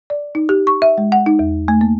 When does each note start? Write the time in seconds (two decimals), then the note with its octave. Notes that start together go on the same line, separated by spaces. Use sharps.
0.10 D5
0.35 D#4
0.49 G4
0.67 C#6
0.82 E5
0.98 G#3
1.12 F#5
1.26 D#4
1.39 E2
1.68 A3
1.81 A#3